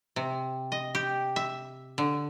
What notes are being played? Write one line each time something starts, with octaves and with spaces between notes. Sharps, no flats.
C3
D#5
G4
E5
D3